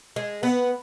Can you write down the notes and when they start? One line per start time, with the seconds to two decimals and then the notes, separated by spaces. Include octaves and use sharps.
0.16 G#3
0.43 B3